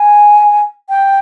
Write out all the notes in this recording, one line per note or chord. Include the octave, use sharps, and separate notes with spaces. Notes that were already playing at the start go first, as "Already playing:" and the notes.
Already playing: G#5
G5